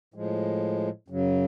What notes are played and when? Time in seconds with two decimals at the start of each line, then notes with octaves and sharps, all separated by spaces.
0.14 A2 F3 G#3
1.08 F#2 C#3 F#3